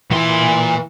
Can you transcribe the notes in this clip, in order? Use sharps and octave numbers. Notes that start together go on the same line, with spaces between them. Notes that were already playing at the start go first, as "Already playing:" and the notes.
A#2 E3 C6